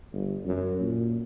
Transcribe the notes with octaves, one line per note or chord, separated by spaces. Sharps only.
G1
F#2
A#2